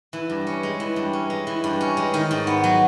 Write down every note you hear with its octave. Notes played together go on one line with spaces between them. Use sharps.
E3
G2
C#4
G#3
E3
G2
C#4
G#3
E3
G2
C#4
G#3
D#3
G#2
B3
F#3